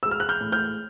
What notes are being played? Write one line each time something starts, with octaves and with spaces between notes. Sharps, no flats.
G#3 E6
F6
F#6
F6 G6
A2
F6 G6